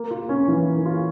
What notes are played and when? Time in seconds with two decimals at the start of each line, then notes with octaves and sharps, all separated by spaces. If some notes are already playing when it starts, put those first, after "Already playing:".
Already playing: A#3
0.11 F4
0.29 C#4
0.48 E3
0.68 A#3
0.86 F4